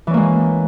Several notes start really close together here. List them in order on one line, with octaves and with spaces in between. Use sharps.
E3 C#4 A#3 G#3